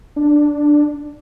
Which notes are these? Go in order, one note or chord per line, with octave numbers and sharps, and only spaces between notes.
D4